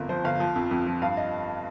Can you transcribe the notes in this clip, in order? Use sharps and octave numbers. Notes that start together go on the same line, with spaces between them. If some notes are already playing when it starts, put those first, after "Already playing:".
Already playing: G1 F2 A#4
F3 C5
G1 F5
F3
F2
F2
F3
G2 F5
D#5